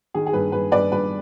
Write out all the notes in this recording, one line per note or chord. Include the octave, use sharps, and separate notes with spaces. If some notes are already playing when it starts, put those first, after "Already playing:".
D#3 G#4
G#4
G2 B4
G2 B4
G2 B4 D5
G2 B4